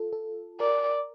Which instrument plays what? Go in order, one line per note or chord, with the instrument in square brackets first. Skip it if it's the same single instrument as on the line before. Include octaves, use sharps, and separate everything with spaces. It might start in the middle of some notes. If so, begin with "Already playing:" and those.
Already playing: [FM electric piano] F4 A4
A4
[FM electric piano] A#4 [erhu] D5